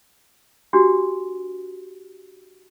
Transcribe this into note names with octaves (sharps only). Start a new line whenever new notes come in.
D4 F#4 G4